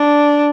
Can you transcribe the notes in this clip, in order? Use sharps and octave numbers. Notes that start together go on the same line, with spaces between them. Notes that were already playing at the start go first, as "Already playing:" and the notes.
Already playing: D4